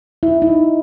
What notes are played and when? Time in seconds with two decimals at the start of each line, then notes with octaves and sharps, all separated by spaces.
0.23 E4
0.42 D#4